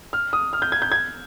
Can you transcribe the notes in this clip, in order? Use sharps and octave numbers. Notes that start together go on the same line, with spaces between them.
F6
D#6
F6
G6
G#6
G6
G#6